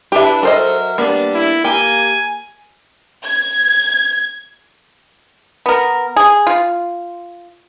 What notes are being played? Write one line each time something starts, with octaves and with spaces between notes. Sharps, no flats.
D4 E4 G4 B4 E5
F#3 A4 A#4 C5 D#5 E5
G3 A#3 B3 D4
E4
A#3 G4 G#5
G#6
B3 A#4
G#4
F4